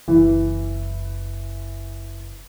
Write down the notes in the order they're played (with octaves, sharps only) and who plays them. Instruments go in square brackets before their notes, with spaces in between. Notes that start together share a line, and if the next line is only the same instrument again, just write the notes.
[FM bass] F#1 [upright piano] E3